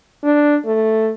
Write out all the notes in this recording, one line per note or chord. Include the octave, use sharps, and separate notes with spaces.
D4
A3